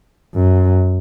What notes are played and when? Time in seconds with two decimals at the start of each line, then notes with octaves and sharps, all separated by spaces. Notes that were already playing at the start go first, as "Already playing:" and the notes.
0.35 F#2